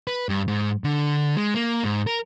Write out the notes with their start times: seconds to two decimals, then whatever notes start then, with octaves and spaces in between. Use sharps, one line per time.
0.07 B4
0.29 G2
0.48 G#2
0.84 D3
1.36 G#3
1.54 A#3
1.84 G#2
2.07 A#4